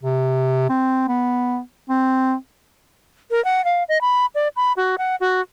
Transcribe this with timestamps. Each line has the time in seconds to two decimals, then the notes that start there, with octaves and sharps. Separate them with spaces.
0.03 C3
0.69 C4
1.09 B3
1.90 C4
3.31 A#4
3.45 F#5
3.65 F5
3.89 D#5
4.01 B5
4.35 D5
4.56 B5
4.77 F#4
4.98 F#5
5.20 F#4